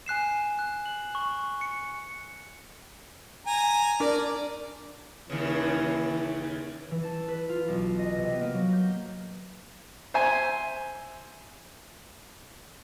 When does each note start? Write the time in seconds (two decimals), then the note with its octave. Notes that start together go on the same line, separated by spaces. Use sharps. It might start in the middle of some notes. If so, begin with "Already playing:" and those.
0.06 G#5 F#6 C7 E7
0.59 F#6
0.86 F#7
1.15 C#6
1.61 C#7
3.47 G#5 A#5
4.00 D4 A#4 D5
5.30 D#2 C#3 E3
6.91 E3
7.03 A5
7.28 B4
7.49 F4
7.68 B1
7.99 D#5
8.17 C3
8.29 B3
8.41 A#3
8.54 F#3
8.73 G6
10.14 C5 E5 G#5